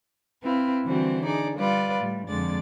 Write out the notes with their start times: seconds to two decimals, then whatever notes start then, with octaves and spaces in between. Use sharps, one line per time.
0.44 C4 E4 B4 F5
0.87 D3 E3 G3 C4 F#4 C5
1.25 D4 D#4 G#4 D5
1.59 G3 F4 B4 D5
2.00 A2 G3
2.29 F2 D3 G#3 D5 A6